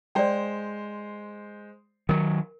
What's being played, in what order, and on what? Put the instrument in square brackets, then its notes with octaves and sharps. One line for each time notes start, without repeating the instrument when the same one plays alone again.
[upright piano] G#3 C5 [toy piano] D5 G5
[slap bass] D#3 F#3 [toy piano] A#4